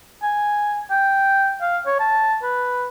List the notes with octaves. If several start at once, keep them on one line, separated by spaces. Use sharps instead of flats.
G#5
G5
F5
C#5
A5
B4